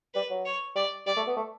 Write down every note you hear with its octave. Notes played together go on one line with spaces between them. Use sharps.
G3 B4
F#3
C#5
G3 D5
G3 D5
A3
B3
A3